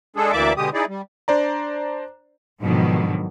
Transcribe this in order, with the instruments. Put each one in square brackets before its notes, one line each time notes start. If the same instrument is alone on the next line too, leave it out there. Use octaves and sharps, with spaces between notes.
[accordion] G#3 D4 G#4 A4
D2 E3 A#3 D5 E5 D6
B2 D3 G#3 G4 D#6
D#4 E4 G#4 D5
G3
[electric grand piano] D4 C5 D5 A#5
[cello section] G#2 B2 D3 D#3 F3 F#3